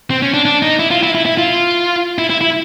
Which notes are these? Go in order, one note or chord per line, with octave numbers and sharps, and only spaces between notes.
C4
C#4
D4
D4
D#4
E4
F4
E4
E4
E4
F4
E4
E4
E4